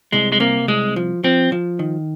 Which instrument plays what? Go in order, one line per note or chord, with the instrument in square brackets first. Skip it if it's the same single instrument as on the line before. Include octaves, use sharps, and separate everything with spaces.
[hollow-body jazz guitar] C2 [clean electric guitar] G#3
[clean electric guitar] G#3
[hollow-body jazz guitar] C3 [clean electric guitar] A#3
[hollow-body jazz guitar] C2 [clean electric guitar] G#3
[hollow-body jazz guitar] F3
[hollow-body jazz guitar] F3 [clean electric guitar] C4
[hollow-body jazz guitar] F3
D#3